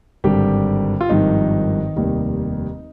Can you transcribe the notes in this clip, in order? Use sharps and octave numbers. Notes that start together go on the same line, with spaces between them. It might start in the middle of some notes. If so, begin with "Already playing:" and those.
G#1 G2 D3 G3 G4
F4
G#1 G2 D#3 F3 D#4
F1 D#2 D#3 G3